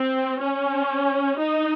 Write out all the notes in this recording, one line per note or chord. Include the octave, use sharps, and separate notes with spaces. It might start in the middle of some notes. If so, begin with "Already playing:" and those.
Already playing: C4
C#4
D#4